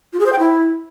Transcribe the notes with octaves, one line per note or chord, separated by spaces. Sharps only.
F4
G#4
C5
G5
E4